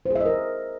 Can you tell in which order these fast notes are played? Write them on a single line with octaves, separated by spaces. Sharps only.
C5 G#4 E5 D#5 A#4